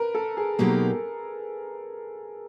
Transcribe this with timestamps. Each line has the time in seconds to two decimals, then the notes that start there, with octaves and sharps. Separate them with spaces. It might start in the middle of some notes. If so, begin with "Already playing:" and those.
Already playing: A#4 B4
0.15 A4
0.37 G#4
0.59 B2 F#3 A#3 D#4 G4